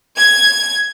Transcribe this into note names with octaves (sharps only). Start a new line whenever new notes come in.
G#6